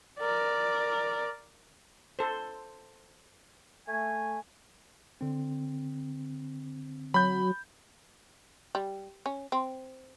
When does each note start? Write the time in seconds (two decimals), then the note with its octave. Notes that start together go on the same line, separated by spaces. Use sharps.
0.20 A#4 D5
2.19 A4 C5
3.88 A3 G#5
5.21 D3 C4
7.14 F#3 B5 G6
8.75 G3
9.26 C#4
9.52 C4